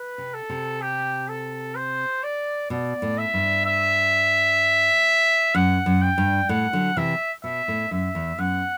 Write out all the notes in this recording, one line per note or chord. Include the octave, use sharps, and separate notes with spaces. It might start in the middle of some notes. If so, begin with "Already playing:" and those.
Already playing: B4
C3
A4
C3
G4
A4
C5
D5
B2 D5
A2
E5
G2
E5
F#2 F#5
F#2
G5
G2
A2 F#5
D3 F#3
C3 E3 E5
B2 E5
A2
F#2 E5
E2
F#2 F#5